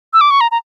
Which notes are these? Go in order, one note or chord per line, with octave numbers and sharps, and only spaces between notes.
E6
D6
C#6
A#5
A#5